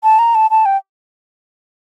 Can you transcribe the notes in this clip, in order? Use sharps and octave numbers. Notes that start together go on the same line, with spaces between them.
A5
A#5
A5
A5
G5